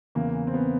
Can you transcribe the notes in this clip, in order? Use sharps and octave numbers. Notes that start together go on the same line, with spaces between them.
E2 C#3 E3 A#3
C4
B3